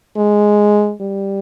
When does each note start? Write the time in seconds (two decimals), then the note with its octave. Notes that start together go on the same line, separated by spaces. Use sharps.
0.17 G#3
1.01 G3